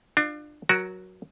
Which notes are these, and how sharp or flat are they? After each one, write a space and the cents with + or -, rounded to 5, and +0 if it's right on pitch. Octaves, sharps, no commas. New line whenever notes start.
D4 +30 F4 +0
F#3 +0 F#4 +0 A#4 +25